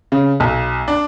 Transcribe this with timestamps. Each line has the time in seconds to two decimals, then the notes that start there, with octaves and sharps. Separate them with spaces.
0.12 C#3
0.40 B1
0.88 D4